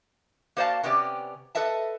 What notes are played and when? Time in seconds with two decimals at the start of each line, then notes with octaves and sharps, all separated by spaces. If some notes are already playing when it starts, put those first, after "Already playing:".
0.57 A#3 F#4 C5 D5 F5 A5
0.83 C3 B3 C#4 G4 D5
1.55 A4 B4 D#5 E5 A5